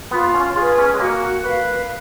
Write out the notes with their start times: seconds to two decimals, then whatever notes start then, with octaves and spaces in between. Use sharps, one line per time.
0.11 B3 F4
0.34 C#4
0.56 F4 G#4 B4
0.78 C#4
0.94 G#3
1.00 A#3 F#4
1.44 B4 F5